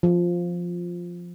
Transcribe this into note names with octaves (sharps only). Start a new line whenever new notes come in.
F3